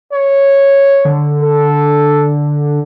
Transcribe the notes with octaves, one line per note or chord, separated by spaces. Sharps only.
C#5
D3
A4